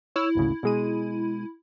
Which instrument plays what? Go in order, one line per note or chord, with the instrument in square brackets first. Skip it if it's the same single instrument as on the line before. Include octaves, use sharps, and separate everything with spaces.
[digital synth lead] E4 [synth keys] C#5 E6 F6
[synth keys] G#1 D2 C#3
B2 G#3 D#7